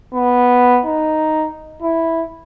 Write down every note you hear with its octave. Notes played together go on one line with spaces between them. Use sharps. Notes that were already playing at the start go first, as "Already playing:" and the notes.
B3
D#4
E4